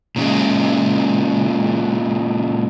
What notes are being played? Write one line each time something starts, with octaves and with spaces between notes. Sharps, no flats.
A#2 C#3 G#3